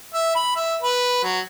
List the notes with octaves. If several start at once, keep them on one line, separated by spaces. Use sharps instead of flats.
E5
B5
E5
B4
F#3